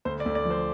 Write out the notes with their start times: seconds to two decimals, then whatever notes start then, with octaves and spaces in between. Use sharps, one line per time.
0.05 D2 C5
0.20 D5
0.26 D2
0.35 D5
0.45 F3
0.51 C5